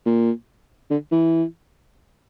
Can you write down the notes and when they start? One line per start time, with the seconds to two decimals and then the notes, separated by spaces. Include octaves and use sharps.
0.06 A#2
0.91 D3
1.12 E3